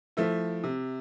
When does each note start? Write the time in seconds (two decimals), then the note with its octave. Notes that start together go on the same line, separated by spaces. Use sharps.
0.17 F3 A3 E4
0.64 C3